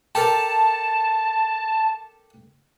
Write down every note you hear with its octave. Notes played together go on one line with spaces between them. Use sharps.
G4 A4 A#4 A5